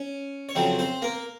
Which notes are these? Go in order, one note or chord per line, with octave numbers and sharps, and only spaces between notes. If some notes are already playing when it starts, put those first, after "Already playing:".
Already playing: C#4
C#5
F2 C#3 F#3 C4 C5
C4 C5
A#3 A#4